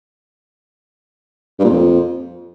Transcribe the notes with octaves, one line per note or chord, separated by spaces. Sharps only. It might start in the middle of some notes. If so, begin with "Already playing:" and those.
G2
A#2
F2